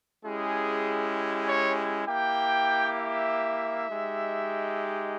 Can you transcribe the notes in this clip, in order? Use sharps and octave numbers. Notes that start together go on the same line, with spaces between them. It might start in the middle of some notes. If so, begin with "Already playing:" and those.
G#3 C#4 E4 G4 G#4
C#5
A#3 E4 G4 G5
E5
G#3 D#4 G4